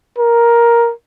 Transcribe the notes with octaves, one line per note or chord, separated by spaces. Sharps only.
A#4